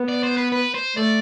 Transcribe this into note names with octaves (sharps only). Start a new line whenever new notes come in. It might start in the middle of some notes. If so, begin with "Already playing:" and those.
Already playing: B3
D5
C5
B4
B4
C5
A3 D5